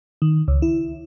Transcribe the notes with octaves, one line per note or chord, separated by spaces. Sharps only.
D#3
C#2
E4